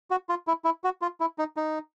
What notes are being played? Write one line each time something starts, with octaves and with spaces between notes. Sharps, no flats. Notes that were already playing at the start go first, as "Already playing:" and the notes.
F#4
F4
E4
E4
F#4
F4
E4
D#4
D#4